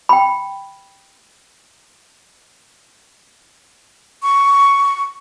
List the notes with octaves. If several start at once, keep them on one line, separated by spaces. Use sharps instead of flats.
G5 B5
C#6